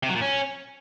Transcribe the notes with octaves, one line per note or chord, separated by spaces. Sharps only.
C3
F#3
A#2
C#4